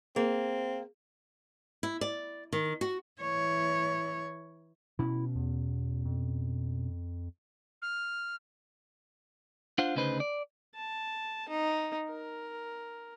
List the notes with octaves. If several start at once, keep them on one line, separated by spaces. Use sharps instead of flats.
A#3 C4 G#4
E4
D5
D#3
F#4
E3 C#5
B2 C#4 E4
E2
F2
F6
D4 F4 C5 F5 F#5
D2 C#3 D#4 B4 C5
D5
A5
D#4
A#4